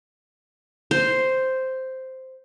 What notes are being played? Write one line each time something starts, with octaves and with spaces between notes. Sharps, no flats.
C5